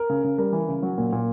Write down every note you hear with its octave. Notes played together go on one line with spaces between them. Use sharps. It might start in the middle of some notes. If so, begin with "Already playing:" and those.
Already playing: A#4
C#3
C#3
G3 A#4
E3
C#3
F#3
A#2
A#2